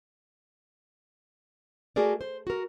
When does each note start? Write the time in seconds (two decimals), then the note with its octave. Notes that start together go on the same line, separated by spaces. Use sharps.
1.96 A3 F#4 G#4 A#4 D5
2.21 C5
2.47 F#4 A#4